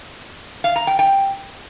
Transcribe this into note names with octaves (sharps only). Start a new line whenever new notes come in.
F5
A#5
G5
G5